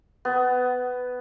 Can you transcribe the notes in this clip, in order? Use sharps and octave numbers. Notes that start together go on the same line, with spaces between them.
B3